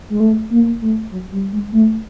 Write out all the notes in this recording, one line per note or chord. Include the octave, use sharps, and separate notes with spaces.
G#3
A3
A#3
A3
F#3
G3
G#3
A3